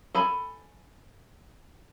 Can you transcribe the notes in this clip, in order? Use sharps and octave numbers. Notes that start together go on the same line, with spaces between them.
A4 G#5 B5